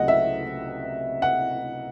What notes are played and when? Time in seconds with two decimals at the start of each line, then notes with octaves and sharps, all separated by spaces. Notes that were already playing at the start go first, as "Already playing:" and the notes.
Already playing: C#2 C3 F#3 A3 D#5 F#5
0.08 E5
1.22 F#5